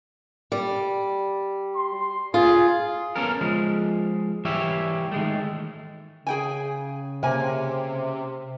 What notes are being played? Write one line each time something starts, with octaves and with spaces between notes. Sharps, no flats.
G3
C6
F4 G#4
B3 C#4 A4 A#4
F3 G#3
E3 G3 E4 G4 C#5 E5
D#3 G#3 A3
C#3 G#4 G5 G#5
C3 A#3 G#5